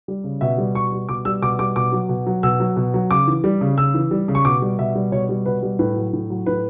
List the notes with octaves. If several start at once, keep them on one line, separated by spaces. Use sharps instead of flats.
G3
C#3
B2 E5
G3
B2 C#6
G3
B2 D6
G3 E6
B2 D6
G3 D6
B2 D6
F#3
B2
F#3
B2 E6
F#3
B2
F#3
C#3 D6
E3
G3
C#3
C#3 E6
E3
G3
C#3
C#6
B2 D6
G3
B2 E5
G3
B2 C#5
G3
B2 B4
G3
A2 B4
F#3
A2
F#3
A2 B4